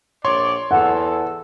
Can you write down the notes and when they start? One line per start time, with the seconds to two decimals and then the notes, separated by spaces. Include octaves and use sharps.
0.25 A#1 C#5 D5 C6
0.71 E2 A4 F#5